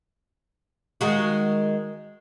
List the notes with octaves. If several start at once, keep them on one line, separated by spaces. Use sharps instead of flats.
D#3 G#3 F#4